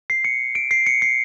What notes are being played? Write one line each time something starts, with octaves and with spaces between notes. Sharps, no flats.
C7
C#7
D7
C7
C#7
C7